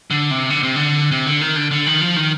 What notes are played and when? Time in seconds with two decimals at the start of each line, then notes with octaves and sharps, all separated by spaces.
0.10 D3
0.31 C3
0.50 D3
0.63 C3
0.76 D3
1.11 C3
1.26 D3
1.41 D#3
1.56 D3
1.71 D3
1.86 D#3
2.01 F3
2.16 D#3